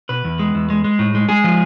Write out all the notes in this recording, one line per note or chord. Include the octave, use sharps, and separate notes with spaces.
B2 B4
E2
G#3
E2
G#3
G#3
A2
G#3
G#3 G#4
F3